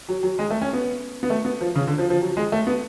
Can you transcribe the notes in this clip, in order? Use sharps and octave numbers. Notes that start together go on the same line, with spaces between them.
F#3
F#3
G#3
A3
C#4
B3
B3
A3
B3
F3
C#3
D3
F3
F3
F#3
G#3
A3
B3